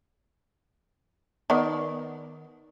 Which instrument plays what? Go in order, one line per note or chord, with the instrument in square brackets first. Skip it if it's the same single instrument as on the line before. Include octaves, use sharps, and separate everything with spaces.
[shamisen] D#3 B3 D5